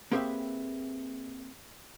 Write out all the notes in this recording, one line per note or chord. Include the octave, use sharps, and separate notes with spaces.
A#3 C4 G4 G#4 B4 E5